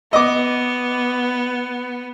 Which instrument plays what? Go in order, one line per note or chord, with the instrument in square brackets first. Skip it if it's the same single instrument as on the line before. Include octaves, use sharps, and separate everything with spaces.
[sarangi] B3 [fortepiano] D#5 D6